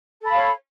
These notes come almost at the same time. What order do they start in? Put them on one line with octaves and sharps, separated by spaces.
A4 B5 F5 C#5